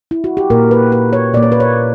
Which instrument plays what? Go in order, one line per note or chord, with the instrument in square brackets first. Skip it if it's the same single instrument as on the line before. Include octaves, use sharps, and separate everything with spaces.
[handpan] E4
F#4
G4
A#2 A#3 A#4
B4
B4
C#5
A#2 A#3 D5
C#5
B4
C#5